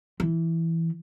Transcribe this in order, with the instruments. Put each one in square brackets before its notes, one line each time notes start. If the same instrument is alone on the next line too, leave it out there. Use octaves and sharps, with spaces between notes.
[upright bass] E3